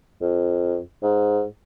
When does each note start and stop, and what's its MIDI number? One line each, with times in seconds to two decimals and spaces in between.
0.21 0.79 41
1.03 1.45 44